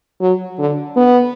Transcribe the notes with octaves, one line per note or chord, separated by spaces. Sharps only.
F#3
D3
B3